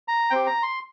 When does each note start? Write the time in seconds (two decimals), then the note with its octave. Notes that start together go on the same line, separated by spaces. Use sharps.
0.08 A#5
0.30 C4 G4 G5
0.46 A#5
0.63 C6